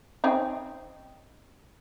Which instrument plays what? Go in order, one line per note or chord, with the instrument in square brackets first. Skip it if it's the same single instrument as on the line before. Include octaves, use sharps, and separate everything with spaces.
[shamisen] C4 C#4 D#4